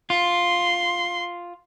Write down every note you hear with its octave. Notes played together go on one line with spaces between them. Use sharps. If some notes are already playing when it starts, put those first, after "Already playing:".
F4 C6